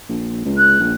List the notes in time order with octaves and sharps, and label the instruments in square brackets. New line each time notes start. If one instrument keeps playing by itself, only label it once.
[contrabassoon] A#1
C#2
[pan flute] F#6
[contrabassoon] A#1